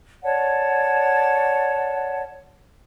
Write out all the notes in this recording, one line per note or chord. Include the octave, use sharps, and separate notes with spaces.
C#5 D5 F#5 A5